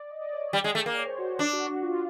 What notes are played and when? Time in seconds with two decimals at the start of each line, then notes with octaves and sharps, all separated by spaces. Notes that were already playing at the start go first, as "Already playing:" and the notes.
Already playing: D5
0.11 D#5
0.21 D5
0.32 C#5
0.42 D5
0.53 G3
0.64 G#3
0.75 A3
0.86 A#3
0.97 C#5
1.07 C5
1.18 F#4
1.29 F#4
1.39 D4
1.53 F#4
1.69 F#4
1.83 F4